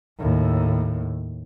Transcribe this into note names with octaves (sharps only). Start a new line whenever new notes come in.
D#2 A2